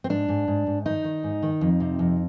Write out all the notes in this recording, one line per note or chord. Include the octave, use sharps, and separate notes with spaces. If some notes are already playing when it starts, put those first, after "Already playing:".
C4
G#2 D4
G#2
G#2
G#2
D#3 D#4
D#3
G#2
D#3
F2
C3
F2